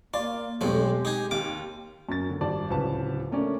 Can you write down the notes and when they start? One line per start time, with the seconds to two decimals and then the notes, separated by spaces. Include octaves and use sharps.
0.14 A#3 F4 D5
0.61 B1 F2 G#3 A3 G4
1.05 D#4 G#4
1.31 D#2 D6
2.09 F#2 A#3 A6
2.29 D3
2.41 G#1 G3 D5 A5
2.69 D1 C#2 B4 A5
3.31 A3 A#3 C#4 D4 D5